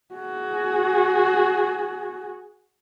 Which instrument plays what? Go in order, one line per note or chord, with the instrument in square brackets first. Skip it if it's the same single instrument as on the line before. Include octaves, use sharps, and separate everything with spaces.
[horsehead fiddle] F#4 G#4